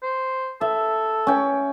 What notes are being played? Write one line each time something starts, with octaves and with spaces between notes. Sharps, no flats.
C5
A4 E5
C#4 G5